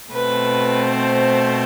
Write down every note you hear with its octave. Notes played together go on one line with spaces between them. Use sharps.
B2 A3 C4 B4
C5